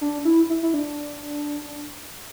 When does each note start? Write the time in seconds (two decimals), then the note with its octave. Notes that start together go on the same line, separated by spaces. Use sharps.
0.01 D4
0.25 E4
0.50 E4
0.63 E4
0.74 D4